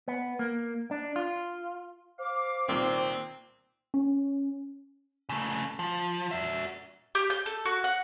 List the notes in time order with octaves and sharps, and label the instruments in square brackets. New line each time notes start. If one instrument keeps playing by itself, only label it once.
[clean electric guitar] B3
A#3
D4
F4
[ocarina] C5 [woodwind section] F5 D6
[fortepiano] C2 A#2 D#3 [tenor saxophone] C4
[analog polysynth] C#4
[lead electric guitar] C#3 A3
F3
F#4 E5
[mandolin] G4
G6
A4
F#4
F#5